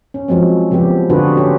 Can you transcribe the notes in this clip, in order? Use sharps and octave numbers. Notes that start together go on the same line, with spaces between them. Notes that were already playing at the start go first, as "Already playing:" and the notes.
C#4
F3 F#3 G#3 C4
C#3 F3 B3 G4
D3 D4 F4 F#4 G#4 B4
C#4 G4 C#5